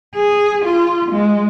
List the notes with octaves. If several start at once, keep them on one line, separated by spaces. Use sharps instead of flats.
G#4
F4
G#3